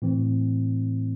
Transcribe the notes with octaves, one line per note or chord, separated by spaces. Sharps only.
A2 E3 C4